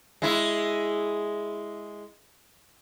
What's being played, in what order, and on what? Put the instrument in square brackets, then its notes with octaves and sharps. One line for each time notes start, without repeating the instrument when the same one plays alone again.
[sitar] G#3 E4